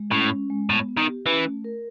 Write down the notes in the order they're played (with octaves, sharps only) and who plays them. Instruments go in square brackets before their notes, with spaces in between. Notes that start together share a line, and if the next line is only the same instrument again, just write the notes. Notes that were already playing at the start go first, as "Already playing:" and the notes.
Already playing: [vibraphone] G#3
[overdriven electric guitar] A2 [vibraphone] C#4
[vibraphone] C#4
G#3
[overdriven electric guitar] A2 [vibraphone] B3
[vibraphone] B3
[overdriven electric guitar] D#3
[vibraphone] G4
[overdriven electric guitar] E3 [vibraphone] C#4
[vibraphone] A3
A#4